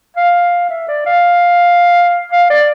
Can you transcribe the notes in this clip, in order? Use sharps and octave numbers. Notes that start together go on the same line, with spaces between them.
F5
E5
D5
F5
F5
D5